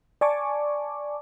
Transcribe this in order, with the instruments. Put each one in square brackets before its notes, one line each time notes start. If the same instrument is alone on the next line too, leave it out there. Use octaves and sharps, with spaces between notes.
[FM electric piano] D5 G#5 A5 C#6 D6